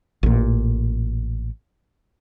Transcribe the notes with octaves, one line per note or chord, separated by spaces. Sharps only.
A1 A#2